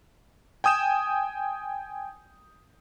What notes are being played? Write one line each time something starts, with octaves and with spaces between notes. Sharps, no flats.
G5 G#5 D#6 G6 E7